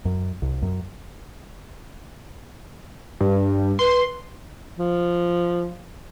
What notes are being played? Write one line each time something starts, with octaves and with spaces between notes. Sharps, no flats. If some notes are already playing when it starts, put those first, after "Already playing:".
F#2
C2
F#2
G2
B4 C6
F3